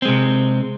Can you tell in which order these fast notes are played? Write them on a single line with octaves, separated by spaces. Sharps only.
C4 G#3 C3